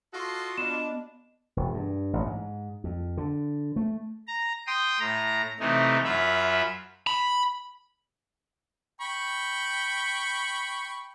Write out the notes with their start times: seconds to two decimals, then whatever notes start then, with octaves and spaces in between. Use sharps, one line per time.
0.14 F4 F#4 A4 D#5 C6
0.57 B3 D4 D#5 E7
1.57 E1
1.74 G2
2.13 A1
2.26 G#2
2.84 F2
3.17 D3
3.76 A3
4.27 A#5
4.67 G5 C6 D#6
5.00 A2 A#5
5.60 C3 E3 A3 D#4
6.05 F#2 F4 E5 B5
7.07 B5
9.01 G5 B5 C#6